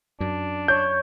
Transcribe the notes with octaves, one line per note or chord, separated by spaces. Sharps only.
F#2 D4
C#5 G6